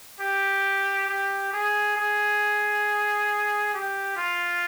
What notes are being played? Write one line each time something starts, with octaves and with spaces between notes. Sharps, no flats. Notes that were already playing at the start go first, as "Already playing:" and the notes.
G4
G4
G#4
G#4
G4
F4